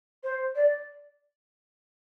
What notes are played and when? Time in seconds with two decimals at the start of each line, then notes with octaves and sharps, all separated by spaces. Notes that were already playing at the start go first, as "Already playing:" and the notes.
0.23 C5
0.55 D5